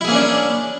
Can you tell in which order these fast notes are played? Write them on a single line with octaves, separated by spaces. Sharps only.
E4 G#4 A#3 C#4 D4